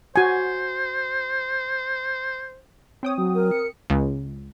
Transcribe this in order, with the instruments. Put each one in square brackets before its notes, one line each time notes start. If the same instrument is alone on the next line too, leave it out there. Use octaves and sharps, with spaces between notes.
[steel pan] F#4 G#5 [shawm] C5
[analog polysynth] C4 G5 D#6 [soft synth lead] C#5
[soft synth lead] F#3
[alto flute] A#4
[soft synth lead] C#7
[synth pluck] C#2